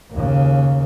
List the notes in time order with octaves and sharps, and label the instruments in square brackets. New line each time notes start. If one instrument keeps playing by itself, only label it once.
[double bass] D#2 C#3